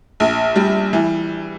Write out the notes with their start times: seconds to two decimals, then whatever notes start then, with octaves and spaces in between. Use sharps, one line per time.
0.20 A#1
0.56 G3
0.93 E3